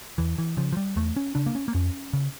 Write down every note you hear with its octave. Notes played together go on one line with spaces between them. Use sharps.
E2 E3
E3
C#3 F3
F3
G3
E2 A3
C#4
C#3 D4
A#3
C#4
A#3
F2 C#4
C#3